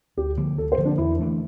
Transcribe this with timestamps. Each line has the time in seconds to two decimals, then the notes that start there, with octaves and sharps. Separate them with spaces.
0.17 D2 G4
0.37 D3 F3 A#3
0.58 D2 A4
0.72 C5
0.78 D3 F3 A#3
0.85 D4
0.98 E2 E4
1.19 E3 A3 D4